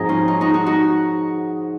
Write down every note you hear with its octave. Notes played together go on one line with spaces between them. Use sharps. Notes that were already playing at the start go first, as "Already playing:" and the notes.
Already playing: G#2 F3 C4 D#4 F#4 G#4
C#4 F4
D#4
D#4 F#4
D#4 F#4
D#4 F#4